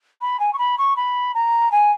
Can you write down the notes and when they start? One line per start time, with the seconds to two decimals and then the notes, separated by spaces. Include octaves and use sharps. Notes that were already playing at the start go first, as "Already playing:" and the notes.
0.21 B5
0.39 G#5
0.53 C#6
0.58 B5
0.78 C#6
0.96 B5
1.34 A#5
1.72 G#5